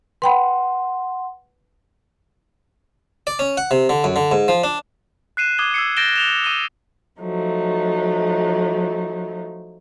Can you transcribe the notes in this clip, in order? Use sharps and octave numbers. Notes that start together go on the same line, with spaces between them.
B4 F#5 G5 B5 C6
D5
C#4
F#5
C3
D3
F#2
D3
G#2
F3
D4
F#6 C7 D#7 E7
D6 D#6 G#6 G7
E6 G#6 C7 C#7
G6 A6 A#6 D7 E7 G7
E7 F7 G7
D#6 D#7 E7 G7
F3 F#3 A3 D#4